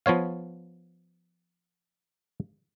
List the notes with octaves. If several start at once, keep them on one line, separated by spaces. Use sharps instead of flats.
F3 B3 C#5 F5